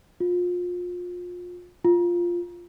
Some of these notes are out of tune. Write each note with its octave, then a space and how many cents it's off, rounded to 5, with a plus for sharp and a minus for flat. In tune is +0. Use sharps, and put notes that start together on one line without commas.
F4 +30
F4 +0